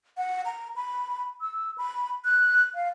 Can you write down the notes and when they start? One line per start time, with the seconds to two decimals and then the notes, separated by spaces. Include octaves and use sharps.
0.17 F#5
0.45 A#5
0.76 B5
1.41 E6
1.78 B5
2.25 F#6
2.75 F5